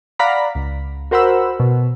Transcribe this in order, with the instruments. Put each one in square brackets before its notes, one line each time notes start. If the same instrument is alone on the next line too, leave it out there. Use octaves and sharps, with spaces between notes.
[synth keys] D5 F5 F#5 A#5 B5 B6
C#2
F#4 A#4 C5 F#5 B5 E6
B2